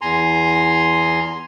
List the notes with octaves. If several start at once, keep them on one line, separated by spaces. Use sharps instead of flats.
E2 G#5 A#5 C6